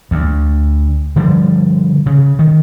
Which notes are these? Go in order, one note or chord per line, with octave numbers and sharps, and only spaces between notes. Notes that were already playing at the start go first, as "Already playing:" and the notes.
D2
D3 F3 G3
C#3
D#3